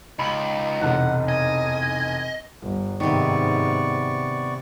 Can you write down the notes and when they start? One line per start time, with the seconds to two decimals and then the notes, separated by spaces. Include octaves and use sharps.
0.19 C#2 D#4 B5 F#7
0.81 F1 B1 E2 F#5
1.29 D#5 G#5
2.62 G1
3.00 G#2 C3 D#3 B3 D5 C#6